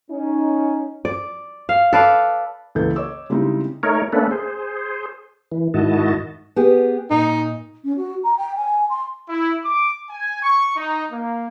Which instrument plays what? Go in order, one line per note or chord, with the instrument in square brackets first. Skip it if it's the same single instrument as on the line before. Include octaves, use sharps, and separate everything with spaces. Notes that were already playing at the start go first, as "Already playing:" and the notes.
[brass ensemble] C#4 D#4
[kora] D5
F5
A4 B4 D5 F5
[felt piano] C#2 E3 A#3 A4 B4 G6
C#5 D#5 D6 E6
C#3 G3 G#3 C4 D#4 E4
[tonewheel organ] A3 D#4 A#4 C#5
A3 A#3 C#4 D4 A4 B4
G#4 C5
E3
G#2 D#3 E4 F#4 D#5 A5
[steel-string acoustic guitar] B3 G4 G#4
[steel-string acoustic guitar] A#2 [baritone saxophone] D#4
[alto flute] C#4
F#4
A#5
G5
G#5
C6
[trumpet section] E4
D6
G#5
C#6
D#4
A#3